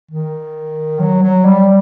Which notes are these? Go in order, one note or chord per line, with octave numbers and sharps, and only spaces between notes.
D#3
F#3
F#3
G3